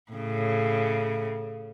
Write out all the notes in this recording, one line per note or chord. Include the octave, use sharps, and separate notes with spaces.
A2 C#3